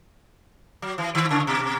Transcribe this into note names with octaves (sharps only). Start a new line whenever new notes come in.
F#3
E3
D#3
C#3
B2